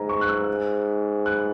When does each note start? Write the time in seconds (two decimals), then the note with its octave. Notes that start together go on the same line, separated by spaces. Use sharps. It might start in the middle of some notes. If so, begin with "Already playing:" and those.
Already playing: G#2 G#5 A#5
0.09 C#6
0.21 F#6
0.29 E6
1.26 F#6